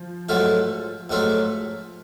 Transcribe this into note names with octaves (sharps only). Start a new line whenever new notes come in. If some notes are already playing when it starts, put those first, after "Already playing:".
Already playing: F3
G#2 F#3 A3 F4
G#2 F#3 A3 F4